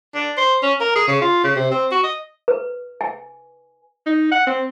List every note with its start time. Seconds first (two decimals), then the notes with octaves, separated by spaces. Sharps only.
0.15 D4
0.37 C5
0.63 C#4
0.80 A#4
0.95 G#4
1.08 C#3
1.21 F4
1.44 C#3
1.56 C3
1.71 C4
1.92 F#4
2.03 D#5
2.48 B4
3.01 G#5
4.07 D#4
4.31 F#5
4.47 C4